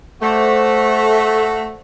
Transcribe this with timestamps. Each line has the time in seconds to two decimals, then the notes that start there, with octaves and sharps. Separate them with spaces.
0.22 A3 F#4 C5 D5